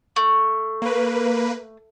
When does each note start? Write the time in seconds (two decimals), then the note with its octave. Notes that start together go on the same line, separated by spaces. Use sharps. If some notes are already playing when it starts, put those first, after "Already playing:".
0.16 A3
0.82 A#3 B4